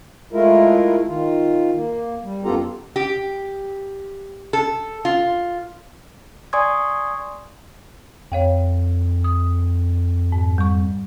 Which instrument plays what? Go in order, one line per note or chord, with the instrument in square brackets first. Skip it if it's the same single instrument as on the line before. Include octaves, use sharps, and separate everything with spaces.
[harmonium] G#3 A3 E4 F4 A#4
D#3 F4
A#3
G3
F#2 B3 F4 G4 A4 A#5
[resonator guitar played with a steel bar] G4
A4
F4
[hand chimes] D5 G#5 C6 C#6 D#6 G#6
[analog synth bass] F2 [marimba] C#5 F5 G5
[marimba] D#6
G#2
G3 C#6